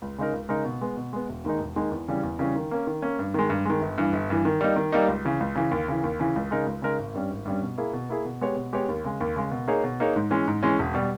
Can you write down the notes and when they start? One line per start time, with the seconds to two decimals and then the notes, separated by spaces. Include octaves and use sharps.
0.02 C#2
0.18 C#3 G#3 D#4 A#4
0.33 C#2
0.49 C#3 G#3 D#4 A#4
0.65 B2
0.81 G#3 B3
0.97 B2
1.13 G#3 B3
1.29 E1
1.44 D#2 D#3 G#3 D#4
1.60 E1
1.76 D#2 D#3 G#3 D#4
1.92 E2
2.08 C#3 E3 G3 C#4
2.23 E2
2.39 C#3 E3 G3 C#4
2.56 D#3
2.71 A#3 C#4
2.87 D#3
3.02 A#3 C#4
3.19 G2
3.34 D#3 G#3
3.50 G2
3.65 D#3 G#3
3.81 G1
3.98 G2 E3
4.13 G1
4.30 G2 E3
4.45 D#3
4.61 G3 A#3 D#4
4.76 D#3
4.92 G3 A#3 D#4
5.08 C#2
5.25 C#3 E3
5.40 C#2
5.55 C#3 E3
5.71 D#2
5.88 C#3 E3
6.04 D#2
6.20 C#3 E3
6.36 C#2
6.51 C#3 G#3 D#4 A#4
6.67 C#2
6.82 C#3 G#3 D#4 A#4
6.99 G#1
7.14 G2 G3 C#4
7.31 G#1
7.45 G2 G3 C#4
7.62 B2
7.78 A#3 E4 G#4
7.93 B2
8.09 A#3 E4 G#4
8.25 B2
8.41 G#3 B3 G4 C#5
8.56 B2
8.73 G#3 B3 G4 C#5
8.89 D#2
9.04 C#3 G#3
9.20 D#2
9.36 C#3 G#3
9.51 B2
9.68 A#3 D#4 G#4 C#5
9.84 B2
10.00 A#3 D#4 G#4 C#5
10.16 G#2
10.31 E3 G#3 C#4
10.48 G#2
10.63 E3 G#3 C#4
10.79 E1
10.94 B2 G3